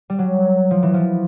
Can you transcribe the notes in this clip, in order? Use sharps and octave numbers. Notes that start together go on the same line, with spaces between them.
G3
F#3
F3
E3
F3